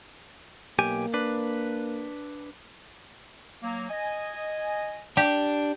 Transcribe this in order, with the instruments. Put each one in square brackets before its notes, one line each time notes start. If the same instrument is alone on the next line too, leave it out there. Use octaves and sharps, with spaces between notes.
[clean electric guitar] B1 G4 G#5 [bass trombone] A#3
[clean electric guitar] D4 B4
[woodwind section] F#3 A#3
D#5 G#5
[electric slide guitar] D4 [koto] G4